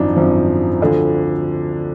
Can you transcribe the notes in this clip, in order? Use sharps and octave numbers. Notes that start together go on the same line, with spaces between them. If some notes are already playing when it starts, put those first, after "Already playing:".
Already playing: G#1 F#2 F3 D4 D#4
G#1 F#2 F3
D2 D3 F3